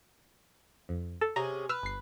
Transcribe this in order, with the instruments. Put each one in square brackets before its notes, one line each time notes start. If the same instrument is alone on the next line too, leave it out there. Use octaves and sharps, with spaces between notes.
[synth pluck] F2
A4
[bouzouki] C3 C#4 G#4 [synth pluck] A#5
[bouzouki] B4 [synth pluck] E6 F6
[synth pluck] G1 C7